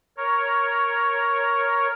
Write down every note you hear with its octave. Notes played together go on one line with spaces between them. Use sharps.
A#4 C#5